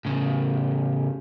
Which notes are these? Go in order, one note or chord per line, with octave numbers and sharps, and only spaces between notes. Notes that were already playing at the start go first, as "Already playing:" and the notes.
A2 C#3